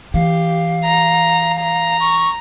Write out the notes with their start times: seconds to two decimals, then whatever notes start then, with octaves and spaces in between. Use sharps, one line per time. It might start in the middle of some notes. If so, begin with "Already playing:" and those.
0.14 E3 G4 F5
0.85 A#5
1.60 A#5
2.00 C#6